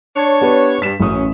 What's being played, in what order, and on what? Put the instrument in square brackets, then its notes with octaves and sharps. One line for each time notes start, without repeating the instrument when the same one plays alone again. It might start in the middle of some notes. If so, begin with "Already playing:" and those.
[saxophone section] D4 C#5
[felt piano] B3 G4 B4
[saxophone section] G2 [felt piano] B6 E7
[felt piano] A1 D#6 [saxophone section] F#2 C#4